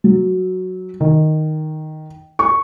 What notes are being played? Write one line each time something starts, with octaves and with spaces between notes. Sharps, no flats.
F#3
D#3
C#6